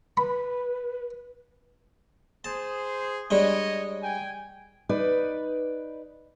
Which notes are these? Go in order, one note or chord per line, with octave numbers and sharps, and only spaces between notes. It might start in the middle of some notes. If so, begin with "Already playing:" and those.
B4 B5
G#4 C5 A5
G3 G#3 D4 C#5 D#5
G5 G#5
D#4 B4 D5